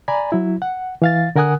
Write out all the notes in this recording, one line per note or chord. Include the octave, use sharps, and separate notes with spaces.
D5 G#5 A#5 B5
F#3 E4
F#5
E3 F5 A6
D3 A#4 F#5 G#5 D#6 F#6